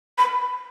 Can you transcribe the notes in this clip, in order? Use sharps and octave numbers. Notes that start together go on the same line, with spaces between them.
B5